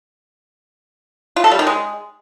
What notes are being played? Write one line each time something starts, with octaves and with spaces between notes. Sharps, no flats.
F4
A4
G3
D#3
G#3